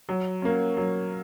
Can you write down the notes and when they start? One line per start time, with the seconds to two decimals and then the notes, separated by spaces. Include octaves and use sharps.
0.09 F#3
0.42 A#3 C#4
0.77 F#3